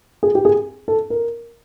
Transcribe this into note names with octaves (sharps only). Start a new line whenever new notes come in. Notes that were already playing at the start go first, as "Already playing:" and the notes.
G#4
G4
G#4
A4
A#4